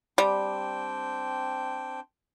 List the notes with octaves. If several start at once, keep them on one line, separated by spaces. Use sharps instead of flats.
G3 C4 D4 G5